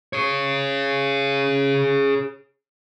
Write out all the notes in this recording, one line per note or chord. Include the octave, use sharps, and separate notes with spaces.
G#4 C#5